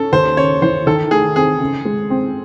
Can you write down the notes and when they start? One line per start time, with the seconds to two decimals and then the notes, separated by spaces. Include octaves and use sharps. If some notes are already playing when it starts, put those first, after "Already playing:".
Already playing: C#4 A4
0.12 D#2 C5
0.37 C#3 C#5
0.62 E3 C5
0.87 D#3 A4
1.11 A3 G#4
1.36 C4 G#4
1.60 C#3
1.85 G#3
2.10 C4